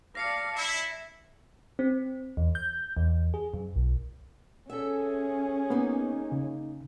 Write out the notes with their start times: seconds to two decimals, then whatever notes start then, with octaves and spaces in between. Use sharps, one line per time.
0.15 D5 F5 A5 A#6 C7 C#7
0.56 E4 E5
1.79 C4
2.37 E2
2.55 G6
2.97 E2
3.34 G#4
3.54 F#2
3.76 B1
4.70 C#4 G#4 A4 E5
5.70 A#3 B3 D#4
6.32 C#3